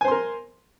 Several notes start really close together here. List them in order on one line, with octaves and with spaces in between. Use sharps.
G#5 C5 C6 A#4